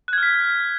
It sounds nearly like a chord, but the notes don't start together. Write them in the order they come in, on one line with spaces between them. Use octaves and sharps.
F#6 G#6 F6 B6